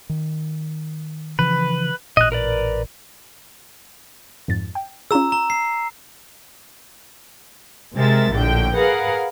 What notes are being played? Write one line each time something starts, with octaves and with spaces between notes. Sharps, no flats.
D#3
C#3 E3 F3 B4
A1 A#2 D#5 F#6
A#4 B4 D5
F2 G#2 A6
G5
C#4 F4 G#4 A#5 E6
A#5
C7
C3 G#3 A#4 E5 A6
A#1 A2 D3 G5
G#4 A#4 B4 F5 F#5